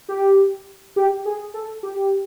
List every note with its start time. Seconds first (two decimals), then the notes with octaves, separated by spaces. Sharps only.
0.09 G4
0.96 G4
1.25 G#4
1.54 A4
1.83 G4